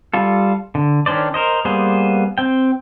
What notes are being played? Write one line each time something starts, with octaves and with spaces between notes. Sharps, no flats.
G3 F4 A4
D3
D#3 C#4 D4 C5 D5
A#4 C5 D#5
G3 A#3 B3 G#4 C5
C4 G5